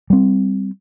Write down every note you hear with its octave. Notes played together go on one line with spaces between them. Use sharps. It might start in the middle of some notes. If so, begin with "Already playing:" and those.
G3 C4